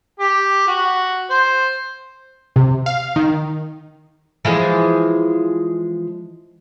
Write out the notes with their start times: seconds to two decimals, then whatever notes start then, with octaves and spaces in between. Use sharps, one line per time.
0.19 G4
0.67 F#4
1.30 C5
2.56 C3
2.86 F5
3.16 D#3
4.45 E3 F3 G#3